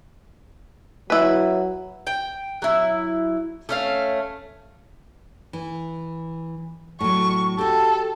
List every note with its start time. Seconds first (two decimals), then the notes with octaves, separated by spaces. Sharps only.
1.10 F#3 E4 B4
2.07 G5
2.62 F#3 E4
3.69 A3 C#4 F5
5.53 E3
7.00 A2 F#3 C#6
7.58 F#4 G4 A4